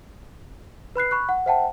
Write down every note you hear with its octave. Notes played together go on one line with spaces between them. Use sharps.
B4 B5 F#6 C7
B5 C#6 F#6
F#5
C5 E5 F#5 G5 A5